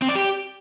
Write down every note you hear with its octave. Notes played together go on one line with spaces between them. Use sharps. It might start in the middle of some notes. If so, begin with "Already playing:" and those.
C4
D5
G4